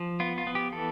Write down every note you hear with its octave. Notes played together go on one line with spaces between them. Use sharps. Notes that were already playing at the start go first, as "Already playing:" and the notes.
Already playing: F3
B3 F4
F4
B3
G4
E3 A4